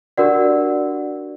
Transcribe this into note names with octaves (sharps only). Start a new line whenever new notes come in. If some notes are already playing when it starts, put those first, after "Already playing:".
D4 F#4 G4 A#4 D5 F#5